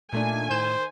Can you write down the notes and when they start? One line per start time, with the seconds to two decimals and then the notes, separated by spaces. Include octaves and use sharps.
0.13 A#2 D#3 A3 D4 G#5
0.50 A2 C5 G6 E7